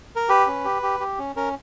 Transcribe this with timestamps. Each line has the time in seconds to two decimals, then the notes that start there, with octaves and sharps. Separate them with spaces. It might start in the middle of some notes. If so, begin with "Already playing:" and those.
0.16 A#4
0.29 G4 B4
0.47 C#4
0.65 G4
0.83 G4
1.00 G4
1.18 C#4
1.36 C#4 A#4